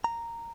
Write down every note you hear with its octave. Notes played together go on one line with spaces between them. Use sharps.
A#5